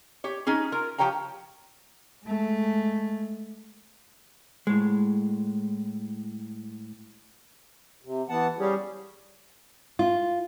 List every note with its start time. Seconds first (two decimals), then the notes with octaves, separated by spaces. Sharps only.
0.24 G4 C#5
0.47 C#4 D#4 G#4
0.72 F4 A#4
0.98 F3 G4 C#5 G5 A#5
2.25 G#3 A3
4.67 A2 G#3
8.04 C3
8.29 E3 B3 F#5 A5
8.59 G3 C#4 G4 G#4
9.99 F4